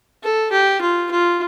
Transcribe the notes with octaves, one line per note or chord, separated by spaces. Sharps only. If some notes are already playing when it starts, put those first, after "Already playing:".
A4
G4
F4
F4